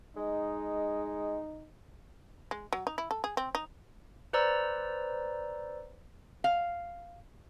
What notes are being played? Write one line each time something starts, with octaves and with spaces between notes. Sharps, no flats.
G#3 D#4
G#3
F#3
D#4
E4
A4
G#4
C4
D#4
B4 C5 D5 A#5 E6
F5